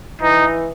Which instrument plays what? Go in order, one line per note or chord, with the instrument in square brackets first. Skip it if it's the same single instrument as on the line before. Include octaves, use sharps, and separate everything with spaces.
[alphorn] E3 [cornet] D#4